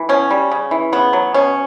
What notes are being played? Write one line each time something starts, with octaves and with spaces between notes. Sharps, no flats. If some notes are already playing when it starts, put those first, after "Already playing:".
Already playing: E3
B2 C#4
G3
C#3
E3
C#3 B3
F#3
B2 C#4